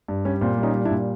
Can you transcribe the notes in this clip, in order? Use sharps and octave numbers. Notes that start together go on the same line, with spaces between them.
G2
G3 C#4
A#2 C4
G3
C#4 D#4
G3
D4 E4
A#2